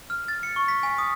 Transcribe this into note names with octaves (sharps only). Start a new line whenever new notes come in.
F6
A6
C#7
C#6
B6
G#5
D#6